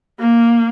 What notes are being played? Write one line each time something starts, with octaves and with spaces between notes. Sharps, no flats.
A#3